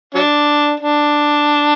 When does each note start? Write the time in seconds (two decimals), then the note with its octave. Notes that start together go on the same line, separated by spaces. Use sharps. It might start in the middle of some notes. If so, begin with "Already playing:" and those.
0.15 F#3 D4
0.80 D4